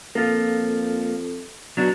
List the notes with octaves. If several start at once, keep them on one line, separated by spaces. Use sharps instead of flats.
F2 A#3 F4 A4
B2 F#3 D4